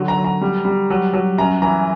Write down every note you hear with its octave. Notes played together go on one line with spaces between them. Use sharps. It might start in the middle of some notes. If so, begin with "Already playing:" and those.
Already playing: D3 F#3
A#5
F#3
A#5
G3
G3
F#3
F#3
F#2 A#5
E3 A#5